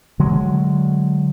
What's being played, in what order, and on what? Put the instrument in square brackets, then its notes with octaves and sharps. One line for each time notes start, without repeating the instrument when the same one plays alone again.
[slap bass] D3 F#3 G#3